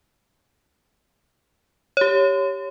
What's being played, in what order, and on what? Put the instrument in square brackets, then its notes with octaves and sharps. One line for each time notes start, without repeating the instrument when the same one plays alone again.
[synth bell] G4 C#5